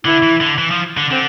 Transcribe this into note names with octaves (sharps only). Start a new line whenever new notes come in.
D3 E4
E3
D3
E3
F3
D3
D3 C4